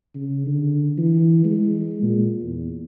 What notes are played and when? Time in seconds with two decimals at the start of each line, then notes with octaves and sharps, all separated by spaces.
0.14 C#3
0.46 D3
0.98 E3
1.45 G#3
2.02 A#2
2.43 E2